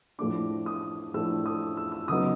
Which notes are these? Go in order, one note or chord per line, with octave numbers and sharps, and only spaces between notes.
A2 F3 A3 D4 D6
D#6
A2 F3 A3 D4 E6
D#6
E6
E6
C#3 F#3 B3 D#4 D#6